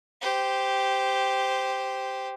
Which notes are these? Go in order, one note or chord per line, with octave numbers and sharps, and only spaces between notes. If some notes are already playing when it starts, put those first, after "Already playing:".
G4 C5